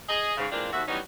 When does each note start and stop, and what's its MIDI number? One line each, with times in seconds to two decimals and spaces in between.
0.09 0.33 68
0.09 0.33 75
0.37 0.47 44
0.37 0.47 49
0.52 0.70 52
0.52 0.70 56
0.52 0.70 58
0.52 0.70 60
0.52 0.70 62
0.52 0.70 65
0.73 0.83 39
0.73 0.83 66
0.73 0.83 76
0.88 1.00 52
0.88 1.00 54
0.88 1.00 55
0.88 1.00 59
0.88 1.00 61
0.88 1.00 63